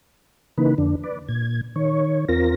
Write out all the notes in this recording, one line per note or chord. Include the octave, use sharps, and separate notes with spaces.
C#3 E3 A#3 D#4 B4
F2 D3 D4
B4 D5
A#2 G#6
D#3 C#5
E2 C4 F4 A#4 A#6